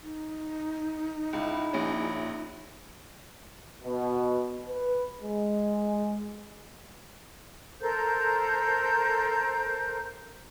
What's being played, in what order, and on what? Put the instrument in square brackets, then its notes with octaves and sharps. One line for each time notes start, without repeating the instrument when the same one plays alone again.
[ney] D#4
[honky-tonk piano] C#2 [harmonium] E4
[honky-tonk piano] A#1 C#4
[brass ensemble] B2
B4
G#3
[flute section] A4 A#4 C5 G6